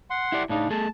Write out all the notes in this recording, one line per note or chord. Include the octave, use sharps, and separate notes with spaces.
F#5 C6
E4 G4 D5
A2 C#3 D4 D#4
A3 G#4 A4 A5